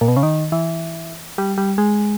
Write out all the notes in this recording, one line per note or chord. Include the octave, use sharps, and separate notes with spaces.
A#2
B2
C#3
D#3
E3
G3
G3
G#3